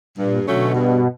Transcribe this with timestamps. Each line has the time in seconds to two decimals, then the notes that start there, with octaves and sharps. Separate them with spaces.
0.18 G2 A#2
0.47 B2 D3 F#3 A3 C#4
0.75 G2